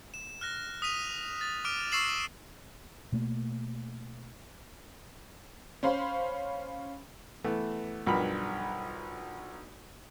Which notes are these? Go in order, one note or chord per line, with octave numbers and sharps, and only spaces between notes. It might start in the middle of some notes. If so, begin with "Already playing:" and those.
E7
F6 F#6 A#6
D#6 B6 D#7 F7
A6
D6 F6 D7 D#7 F7
C#6 E6 A6 C7 E7 F#7
B2 A3 A#3
C#4 C5 F5 B5
E3 A3 B3
B1 G2 F3 A#4 B4 B5